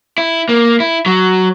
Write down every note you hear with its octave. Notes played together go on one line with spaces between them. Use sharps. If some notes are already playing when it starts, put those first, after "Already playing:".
E4
A#3
E4
F#3